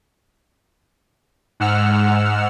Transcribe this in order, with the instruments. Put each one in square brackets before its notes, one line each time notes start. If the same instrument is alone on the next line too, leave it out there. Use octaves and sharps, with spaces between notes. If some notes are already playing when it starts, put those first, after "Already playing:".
[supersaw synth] G#2 F#5 E6 F6